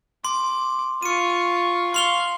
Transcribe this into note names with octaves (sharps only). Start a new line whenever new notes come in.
C6 D6
F4 C#6 C#7 D#7
F5 C6 C#6 F7 G7